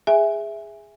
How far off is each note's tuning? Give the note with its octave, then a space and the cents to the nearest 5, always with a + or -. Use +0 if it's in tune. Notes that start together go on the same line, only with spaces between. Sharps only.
G#4 -10 E5 +0 G#5 -10